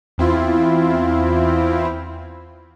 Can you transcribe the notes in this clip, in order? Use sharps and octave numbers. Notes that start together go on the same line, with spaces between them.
E2 C4 E4 F4